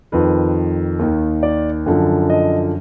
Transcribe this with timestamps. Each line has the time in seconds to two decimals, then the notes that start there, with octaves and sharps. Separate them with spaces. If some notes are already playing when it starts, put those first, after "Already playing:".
0.12 F2 D#3 B4
0.99 D#2 D#3
1.43 D5
1.86 F#2 D3 F3
2.30 D#5